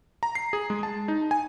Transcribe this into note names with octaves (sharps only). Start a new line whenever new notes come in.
A#5
C7
G#4
G#3
A5
D#4
G#5